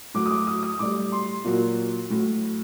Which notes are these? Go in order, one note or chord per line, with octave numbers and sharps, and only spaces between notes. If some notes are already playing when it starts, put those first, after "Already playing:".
A2 F#3 D6
D#6
D6
D#6
D#6
A2 G3 D6
C6
A#2 F#3
A2 F#3